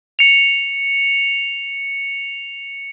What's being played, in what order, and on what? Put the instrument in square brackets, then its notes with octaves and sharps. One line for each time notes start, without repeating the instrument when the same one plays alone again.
[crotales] C#7 F7